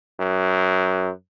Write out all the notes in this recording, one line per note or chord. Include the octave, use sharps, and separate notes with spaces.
F#2